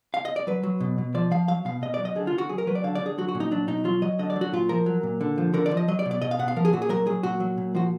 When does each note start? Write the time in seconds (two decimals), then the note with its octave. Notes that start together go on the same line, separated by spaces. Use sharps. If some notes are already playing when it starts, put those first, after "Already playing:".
0.14 F5
0.25 D#5
0.36 D5
0.47 F#3 B4
0.63 F#3
0.80 B2
0.98 B2
1.14 F3 D5
1.31 F3 F5
1.48 F#3 F5
1.65 B2 F5
1.82 B2 D#5
1.94 D5
1.99 F#3
2.05 D#5
2.15 D3 G#4
2.27 F4
2.33 D3
2.38 F#4
2.49 F#3 G#4
2.58 A#4
2.67 F#3 B4
2.75 D5
2.84 D3 F5
2.95 D5
3.01 D3
3.06 G#4
3.18 F#3 F#4
3.28 F#4
3.35 A#2
3.40 D#4
3.51 F#3 D4
3.68 B2 D#4
3.85 F#3 F4
4.02 F#3 D#5
4.19 D3 D#5
4.30 D5
4.36 F#3
4.41 F#4
4.53 A#2 F4
4.69 F3 A#4
4.86 F#3
5.03 A#2
5.21 D3
5.38 F3
5.54 D3 A#4
5.66 D5
5.71 F3
5.77 D#5
5.88 F#3 D#5
5.99 D5
6.06 B2
6.11 D5
6.22 B2 D#5
6.31 F5
6.39 B2 F#5
6.48 F5
6.56 F3 A#4
6.65 G#4
6.73 A#2 F#4
6.82 G#4
6.89 F#3 A#4
7.07 F#3 G#4
7.23 A#2 F#4
7.40 F#3
7.58 A#2
7.75 F3 F#4